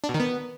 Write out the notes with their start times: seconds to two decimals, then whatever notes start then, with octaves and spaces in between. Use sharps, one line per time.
0.04 D4
0.09 B2
0.14 D#3
0.20 B3